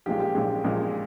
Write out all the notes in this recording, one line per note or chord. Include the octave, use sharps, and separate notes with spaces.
A#1 A#2 G#3 G4
G4
A#1 A#2 G#3
A#1 A#2 G#3